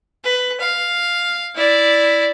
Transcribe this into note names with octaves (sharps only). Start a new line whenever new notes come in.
B4
F5
E4 D5